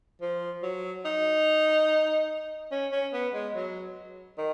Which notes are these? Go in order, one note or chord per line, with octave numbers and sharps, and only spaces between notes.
F3
F#3
D#4
C#4
C#4
B3
G#3
F#3
D#3